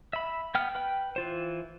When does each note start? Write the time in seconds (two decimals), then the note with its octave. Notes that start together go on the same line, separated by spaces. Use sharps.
0.13 E5 B5
0.55 B3 G5 F6
0.75 B4 G5
1.16 E3 F4 C5